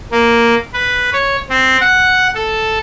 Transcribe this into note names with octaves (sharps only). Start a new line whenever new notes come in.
A#3
B4
C#5
C4
F#5
A4